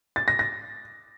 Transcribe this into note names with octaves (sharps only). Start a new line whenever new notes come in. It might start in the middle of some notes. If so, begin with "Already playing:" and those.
A6
A#6
A#6